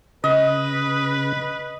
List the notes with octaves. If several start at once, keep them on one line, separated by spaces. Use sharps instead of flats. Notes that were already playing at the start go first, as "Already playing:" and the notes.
C#3 B4 D#5